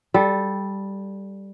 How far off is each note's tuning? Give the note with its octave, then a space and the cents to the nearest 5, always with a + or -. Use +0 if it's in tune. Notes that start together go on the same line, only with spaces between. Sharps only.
G3 +0 A4 -15